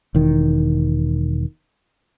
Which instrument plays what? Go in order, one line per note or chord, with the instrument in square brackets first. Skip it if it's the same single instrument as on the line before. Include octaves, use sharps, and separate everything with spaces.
[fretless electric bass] E1 D#3